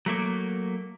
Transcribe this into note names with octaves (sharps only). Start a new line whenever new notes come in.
F#3 A3 A#3